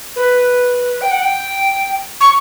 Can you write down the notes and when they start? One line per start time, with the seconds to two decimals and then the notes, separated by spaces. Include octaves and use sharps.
0.16 B4
1.01 G5
1.11 F#5
1.22 G5
2.21 C#6